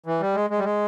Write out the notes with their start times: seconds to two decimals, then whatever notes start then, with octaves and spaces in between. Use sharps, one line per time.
0.06 E3
0.20 G3
0.35 G#3
0.50 G#3
0.59 G3
0.64 G#3